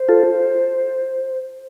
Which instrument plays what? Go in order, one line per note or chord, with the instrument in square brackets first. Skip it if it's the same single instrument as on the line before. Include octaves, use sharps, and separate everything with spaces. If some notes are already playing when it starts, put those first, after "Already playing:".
Already playing: [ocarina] C5
[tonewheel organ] F4 A4